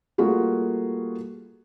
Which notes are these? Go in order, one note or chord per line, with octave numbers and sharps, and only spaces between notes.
G3 A3 A#3 F4 F#4 G#4